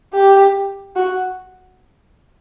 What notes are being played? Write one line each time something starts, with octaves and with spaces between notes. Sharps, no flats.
G4
F#4